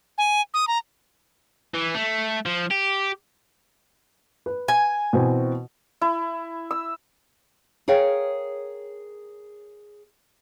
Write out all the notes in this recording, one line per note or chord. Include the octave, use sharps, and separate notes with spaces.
G#5
D#6
A#5
E3
A3
F3
G4
B4
G#5
B2 E3 C4
E4
E6
G#4 A#4 C#5 F5 G5